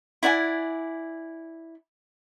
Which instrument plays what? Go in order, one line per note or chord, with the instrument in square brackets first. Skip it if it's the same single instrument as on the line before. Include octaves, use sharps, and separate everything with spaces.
[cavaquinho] E4 D5 F#5 G#5